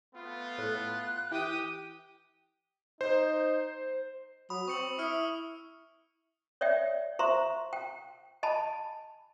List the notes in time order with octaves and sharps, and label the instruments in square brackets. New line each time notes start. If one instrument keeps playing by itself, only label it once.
[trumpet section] A3 B3 F4
[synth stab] A2 [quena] F#6
[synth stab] E3 [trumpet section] G4 [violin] G5 D#6
[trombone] D#4 [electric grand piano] C5
[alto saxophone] F#3 [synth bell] B5 [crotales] D#6
[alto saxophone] C4 [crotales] C#6 C#7 F#7
[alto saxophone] E4 [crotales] D#6 F6 C#7
[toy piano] C#5 D5 E5 G5
C5 E5 A#5 C6 C#6
G5
D#5 G#5 A5 B5